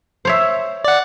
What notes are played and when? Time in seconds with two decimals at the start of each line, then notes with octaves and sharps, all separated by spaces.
0.25 C5 C#5 E5
0.85 D5 F#5